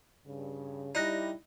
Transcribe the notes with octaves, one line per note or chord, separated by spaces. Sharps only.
G2 C#3
G3 D#4 E4 D5 F#6 A#6